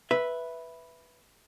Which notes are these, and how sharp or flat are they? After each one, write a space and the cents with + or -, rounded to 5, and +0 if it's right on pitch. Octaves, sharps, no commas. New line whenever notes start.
B4 +0 E5 +0